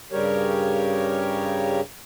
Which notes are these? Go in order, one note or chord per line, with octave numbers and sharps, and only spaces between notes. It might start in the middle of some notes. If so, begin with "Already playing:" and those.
G2 C#3 G3 G4 A#4 C#5